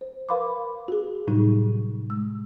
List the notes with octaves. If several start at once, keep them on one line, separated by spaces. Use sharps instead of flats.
C5
A#4 B4 F5 B5 C6 D6
F#4 G#4
A2 C3 F#3 G3 D#4 G#4
G#3 E6